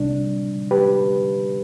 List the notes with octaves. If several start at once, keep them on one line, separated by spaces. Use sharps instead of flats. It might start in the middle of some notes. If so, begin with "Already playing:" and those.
Already playing: C2 C3 G3 D4
G4 B4